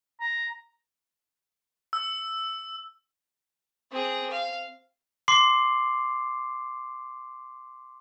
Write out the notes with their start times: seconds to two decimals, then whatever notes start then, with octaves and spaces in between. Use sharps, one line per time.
0.20 A#5
1.93 E6
3.92 C4 G#4
4.30 F5
5.28 C6 D6 C7